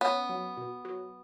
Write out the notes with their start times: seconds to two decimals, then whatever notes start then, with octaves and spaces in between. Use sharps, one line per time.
0.01 B3 C#4
0.29 F#3
0.57 B2
0.85 F#3